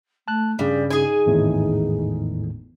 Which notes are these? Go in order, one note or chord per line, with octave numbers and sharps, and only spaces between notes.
A3 A5 F#6
G2 C#3 G3 G#4
D#4 G#4 G#5
G#1 E2 A2